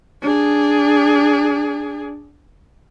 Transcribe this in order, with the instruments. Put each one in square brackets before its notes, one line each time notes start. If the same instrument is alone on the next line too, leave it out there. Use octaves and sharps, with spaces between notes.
[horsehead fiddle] D4 G#4